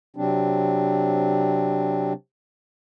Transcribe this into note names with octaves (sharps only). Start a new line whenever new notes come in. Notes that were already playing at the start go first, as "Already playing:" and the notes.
C3 F#3 C4 D4